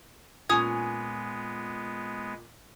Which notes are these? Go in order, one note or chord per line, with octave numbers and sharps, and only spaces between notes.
A#2 G#3 B3 C#4 G#5 D#6 G#6